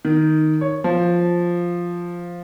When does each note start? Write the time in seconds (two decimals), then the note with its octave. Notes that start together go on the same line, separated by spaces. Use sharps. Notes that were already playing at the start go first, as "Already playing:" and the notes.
0.05 D#3
0.61 C#5
0.84 F3